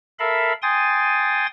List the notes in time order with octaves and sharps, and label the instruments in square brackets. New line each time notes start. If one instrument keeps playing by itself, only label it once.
[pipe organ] A4 A#4 E5 F5 B5
G5 G#5 C6 D#6 A6